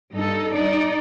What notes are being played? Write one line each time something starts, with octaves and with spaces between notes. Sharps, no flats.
G2 D#4 A4
D#4 D5